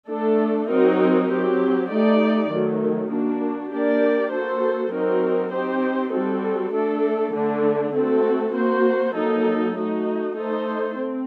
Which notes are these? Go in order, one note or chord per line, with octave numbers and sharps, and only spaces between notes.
A3 D4 A4
F#3 C4 D#4 F#4 A#4
F#3 C4 G4
A3 D#4 G4 D5
D#3 F#3 A3
A#3 D4 F#4
A#3 D4 G4 A#4 D5
A#3 F#4 A4 C5
F#3 C4 D#4 F#4 A#4
C4 D#4 G4 C5
G3 C4 F#4 A4
A3 D4 A4
D3 A3 D4
A3 C4 F#4 A4
A#3 F#4 C5
F#3 A#3 D#4 A4
A3 D#4 F#4
A3 D#4 A4 C5
C4